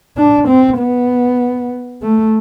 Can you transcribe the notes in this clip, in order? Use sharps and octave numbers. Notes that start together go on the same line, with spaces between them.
D4
C4
B3
A3